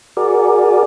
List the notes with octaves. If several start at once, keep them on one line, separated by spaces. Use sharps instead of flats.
F#4 G#4 A#4 D5